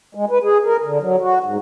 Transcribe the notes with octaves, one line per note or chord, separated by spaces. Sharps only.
G#3
B4
G#4
A#4
D3
F#3
F#4
G#2